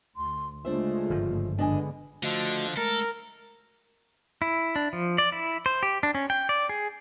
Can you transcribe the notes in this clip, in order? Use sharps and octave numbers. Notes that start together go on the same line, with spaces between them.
D2 C6
C#3 G#3 A3 D4 F4 C5 E5
G1 G#2 F3
D3 G#3 B3 D4 D#5 G#5
D3 F3 A3 F#4 D#5
G#3 A3 A4 A#4
E4
D4
F3
D5
E4
C5
G4
D4
C#4
G5
D5
G#4